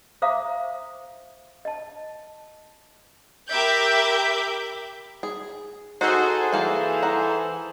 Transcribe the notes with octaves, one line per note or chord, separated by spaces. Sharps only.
C5 E5 F5 A#5 D6 D#6
D#5 A5
G4 A#4 E5 B5 D6 G6
G#4
D#4 F#4 G#4 A4 C5
E3 A#3 F5 G#5
F#5 A#5